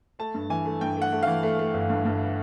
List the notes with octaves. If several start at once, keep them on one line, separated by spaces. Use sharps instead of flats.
A3 A5
G2
E3 G#5
A3
G2 G5
A3 F#5
A3
E3 F5
A3
A3
G1
G2
G2